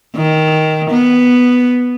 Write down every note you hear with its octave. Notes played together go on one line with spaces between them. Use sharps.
D#3
B3